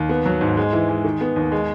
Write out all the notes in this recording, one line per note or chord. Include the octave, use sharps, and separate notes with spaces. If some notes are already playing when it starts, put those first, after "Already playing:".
Already playing: D#2
B3
F#3
G#2
G#3
E3
G#3
D#3
B3
D#2
G#3